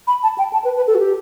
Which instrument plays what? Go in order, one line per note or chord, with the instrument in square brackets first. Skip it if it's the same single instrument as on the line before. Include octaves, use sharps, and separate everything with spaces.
[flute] B5
A5
G5
A5
B4
B4
A4
F#4
G4